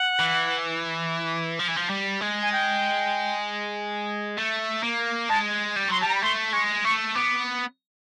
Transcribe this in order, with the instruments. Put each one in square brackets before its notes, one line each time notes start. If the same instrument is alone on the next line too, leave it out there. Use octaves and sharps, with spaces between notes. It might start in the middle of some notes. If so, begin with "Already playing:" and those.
Already playing: [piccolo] F#5
[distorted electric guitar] E3
F3
E3
F3
G3
G#3
[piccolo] G#5
G5
[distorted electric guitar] A3
A#3
[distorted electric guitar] G#3 [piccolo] A5
[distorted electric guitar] G3
[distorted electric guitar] F#3 [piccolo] C6
[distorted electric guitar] G3 [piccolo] A5
[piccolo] A#5
B5
[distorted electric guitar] A3 [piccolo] C6
[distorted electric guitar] G#3 [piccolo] C#6
[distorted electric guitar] A3 [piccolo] C#6
[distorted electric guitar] B3 [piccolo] D6